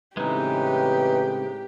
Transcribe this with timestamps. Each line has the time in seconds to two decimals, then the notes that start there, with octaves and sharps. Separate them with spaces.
0.17 A2 C#3 E3 G#3 C4 D#4 G4 B4